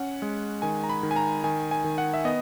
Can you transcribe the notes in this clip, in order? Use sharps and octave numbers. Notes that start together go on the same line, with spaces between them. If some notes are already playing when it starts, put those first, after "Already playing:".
Already playing: C#4 F#5
G#3
D#3 G#5
A#5
B5
D#3
G#5
A#5
D#3 G#5
G#5
D#3
F#5
E5
B3 D#5